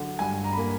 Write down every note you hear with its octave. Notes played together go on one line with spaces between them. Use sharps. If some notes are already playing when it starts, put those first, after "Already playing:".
Already playing: D3 F#3 F#5
G2 G#5
A#5
B5
A#3 A#5